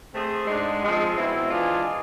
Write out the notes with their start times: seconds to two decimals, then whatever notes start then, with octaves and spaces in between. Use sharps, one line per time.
0.13 A3 C4 G#4 C5
0.48 G#2 G#3 D4
0.82 F3 G#3 C4
1.16 B2 G#3 C4 E4
1.50 E3 G#3 D4 F4 G#4